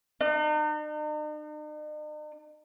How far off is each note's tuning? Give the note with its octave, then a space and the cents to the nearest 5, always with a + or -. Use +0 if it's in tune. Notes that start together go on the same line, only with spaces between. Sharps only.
D#4 -45